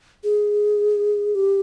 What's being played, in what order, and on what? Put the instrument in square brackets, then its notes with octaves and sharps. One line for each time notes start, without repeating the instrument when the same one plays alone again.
[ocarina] G#4
G4